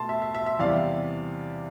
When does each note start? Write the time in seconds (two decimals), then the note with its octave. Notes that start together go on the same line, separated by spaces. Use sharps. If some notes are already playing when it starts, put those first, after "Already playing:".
Already playing: B2 A3 A5 C6
0.09 E5
0.22 E5
0.34 E5
0.46 E5
0.59 E2 C3 G3 D5 F5